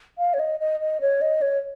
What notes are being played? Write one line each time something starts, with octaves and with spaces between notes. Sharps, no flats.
F5
C#5
D#5
D#5
D#5
C#5
D#5
C#5